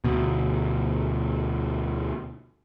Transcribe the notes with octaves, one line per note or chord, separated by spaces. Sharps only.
D2 B2